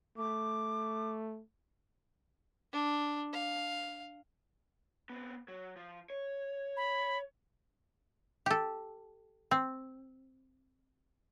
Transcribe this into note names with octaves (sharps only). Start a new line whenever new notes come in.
A3 D6
D4
F5
B3 C4
F#3
F3
C#5
B5
G4 A4
C4